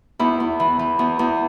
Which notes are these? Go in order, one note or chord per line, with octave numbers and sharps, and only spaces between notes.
E2 E4
E2
E3
E3
E2
E2